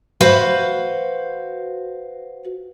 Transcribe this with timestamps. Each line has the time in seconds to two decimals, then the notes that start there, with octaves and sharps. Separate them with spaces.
0.21 F#4 B4 C5 F5